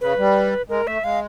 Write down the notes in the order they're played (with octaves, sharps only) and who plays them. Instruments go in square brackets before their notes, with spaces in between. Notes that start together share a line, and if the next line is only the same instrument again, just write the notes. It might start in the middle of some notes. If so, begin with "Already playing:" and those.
[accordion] C#3 [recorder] B4
[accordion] G3
[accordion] G#3 [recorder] A#4
[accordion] A3 [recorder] E5
[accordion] G#3 [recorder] F5